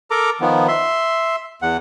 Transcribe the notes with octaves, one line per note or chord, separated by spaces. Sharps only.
A4 A#4 A#5 D6
D#3 F3 B3
E5 C6
E2 F#5